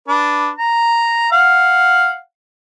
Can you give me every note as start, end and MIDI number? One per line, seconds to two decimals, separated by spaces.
0.08 0.50 62
0.08 0.50 71
0.58 1.31 82
1.32 2.19 77
1.32 2.19 78